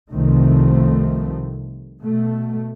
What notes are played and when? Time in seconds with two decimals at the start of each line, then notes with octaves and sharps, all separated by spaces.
0.13 C2 C3 D#3 F3 A3 C4
2.02 B2 A3